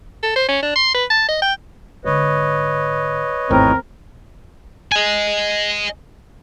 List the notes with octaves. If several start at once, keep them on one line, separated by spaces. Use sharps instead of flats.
A4
C5
C#4
D4
C6
B4
A5
D#5
G5
G#2 D3 B4 C#5 D#5
G#1 E2 A2 C4 A#4
D#5 G#5